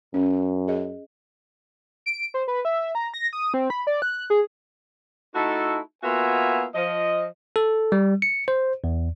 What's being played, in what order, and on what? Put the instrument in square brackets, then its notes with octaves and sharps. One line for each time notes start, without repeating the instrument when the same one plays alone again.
[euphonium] F#2 [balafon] C#4
[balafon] G#4 D#5
[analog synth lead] D7
C5
B4
E5
A#5
A#6
D#6
C4
B5
D5
F#6
G#4
[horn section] A3 D#4 E4 F#4 A4
A#3 B3 F4 F#4 E5 G#5
F3 D#5
[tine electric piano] A4
G3
C#7
C5
E2